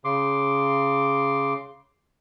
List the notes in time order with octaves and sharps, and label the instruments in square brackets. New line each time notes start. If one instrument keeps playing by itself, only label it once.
[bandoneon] C#3 C6 D6